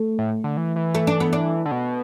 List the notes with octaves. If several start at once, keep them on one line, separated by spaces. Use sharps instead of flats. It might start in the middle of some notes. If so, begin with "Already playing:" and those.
Already playing: A3
A2
D3
E3
E3
A3
D4
B3
D4
D3
B2